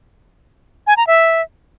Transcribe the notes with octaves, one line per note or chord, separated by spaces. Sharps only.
G#5
A#5
E5